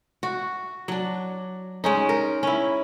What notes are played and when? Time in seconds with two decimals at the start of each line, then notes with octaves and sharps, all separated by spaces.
0.23 F#4
0.88 F#3 D4
1.84 G#3 C#4 D#4
2.09 A#4
2.43 C#4 E4